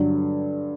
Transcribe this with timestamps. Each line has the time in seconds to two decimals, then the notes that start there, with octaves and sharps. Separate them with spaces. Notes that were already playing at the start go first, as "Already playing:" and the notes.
Already playing: G2 D3 F#3